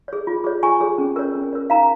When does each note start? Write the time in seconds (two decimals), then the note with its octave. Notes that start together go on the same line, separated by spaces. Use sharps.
0.08 G#4 C#5
0.27 F4
0.44 G#4 C#5
0.63 F4 G#5 C#6
0.81 G#4 C#5
0.98 C#4
1.16 A#4 C#5
1.35 C#4
1.53 A#4 C#5
1.70 D#4 F5 A#5